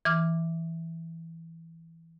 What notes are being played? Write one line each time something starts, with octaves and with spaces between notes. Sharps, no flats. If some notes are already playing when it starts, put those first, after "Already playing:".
E3 D6 F6